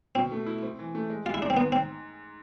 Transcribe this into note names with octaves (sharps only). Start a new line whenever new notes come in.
B2 C4
A3
E4
C4
E3
A3
G#3
G#3 F4
E4
G#2 D4
C4
G#2 B3
C4